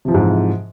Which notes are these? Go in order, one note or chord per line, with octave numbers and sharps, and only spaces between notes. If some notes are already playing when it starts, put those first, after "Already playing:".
G#2 C3 E3 F3